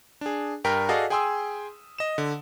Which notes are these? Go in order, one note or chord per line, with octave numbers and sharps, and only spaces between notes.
D4 G#4
G2 A#4 G5 F6 B6
F#4 G#4 A4 D5 D#5 F5
G#4 G5 G#5 C6 D#6 E6
D#5 E7
D3